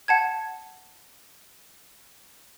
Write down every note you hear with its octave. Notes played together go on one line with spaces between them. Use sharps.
F#5 A5 G#6